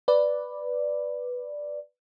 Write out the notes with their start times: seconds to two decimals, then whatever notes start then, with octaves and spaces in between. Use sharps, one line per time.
0.08 B4 D5